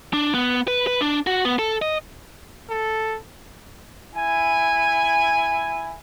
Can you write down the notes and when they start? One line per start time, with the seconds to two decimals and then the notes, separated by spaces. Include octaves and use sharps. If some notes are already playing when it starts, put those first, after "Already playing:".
0.14 D4
0.35 B3
0.68 B4
0.87 B4
1.01 D4
1.27 F#4
1.45 B3
1.59 A4
1.82 D#5
2.70 A4
4.16 E4 G#5